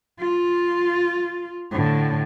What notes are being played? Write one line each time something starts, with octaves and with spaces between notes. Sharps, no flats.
F4
A2 D3